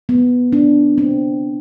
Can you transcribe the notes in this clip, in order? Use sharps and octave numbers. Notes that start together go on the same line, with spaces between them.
B3
D4
C4